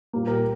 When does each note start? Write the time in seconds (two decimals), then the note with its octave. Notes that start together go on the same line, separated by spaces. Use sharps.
0.13 A#2 G3 A#3
0.27 G4 A#4